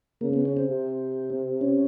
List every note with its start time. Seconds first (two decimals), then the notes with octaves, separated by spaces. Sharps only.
0.21 C#3 A#3
0.33 B3
0.45 C#4
0.57 C4
0.68 C3
1.61 C#4